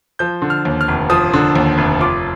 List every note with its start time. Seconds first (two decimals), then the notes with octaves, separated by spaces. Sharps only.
0.19 F3 G6
0.42 D3
0.50 F6
0.65 D#2
0.81 F6
0.88 F1
1.10 F3 D#6
1.34 D3
1.55 D#2
1.78 F1
2.00 F4 D6